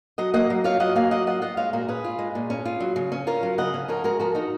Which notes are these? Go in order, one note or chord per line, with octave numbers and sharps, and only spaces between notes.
F#3 D#5 F#5
A#3 D#5 F#5
F#3
F4 C#5 F5
F#3 D#5 F#5
A#3 F5 G#5
F#3 D#5 F#5
F4 D#5 F#5
F4 D#5 F#5
G#3 C#5 F5
A#2 F#4 A#4
C#4 G#4 B4
F4
G#3
A#2
C#4
F4
F#3
C#3
C#4
F4 A#4 C#5
F#3
C#3 D#5 F#5
C#4
F3 A#4 C#5
G#3 F#4 A#4
F3 F#4 A#4
D#4 F#4